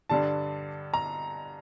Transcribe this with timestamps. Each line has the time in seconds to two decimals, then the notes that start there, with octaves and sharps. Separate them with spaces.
0.09 G2 D3 G3 D4 A5
0.94 A#5